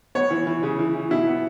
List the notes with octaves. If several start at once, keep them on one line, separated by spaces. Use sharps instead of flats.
B3 C#5
E3
E3
C#3
E3
E3
B2 E4
B3